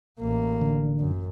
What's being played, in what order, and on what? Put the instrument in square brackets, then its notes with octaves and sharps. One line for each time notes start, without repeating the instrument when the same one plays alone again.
[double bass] A1 A#3
[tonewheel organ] D3
[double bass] F#2